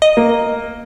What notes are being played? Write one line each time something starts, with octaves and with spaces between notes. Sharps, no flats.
D#5
A#3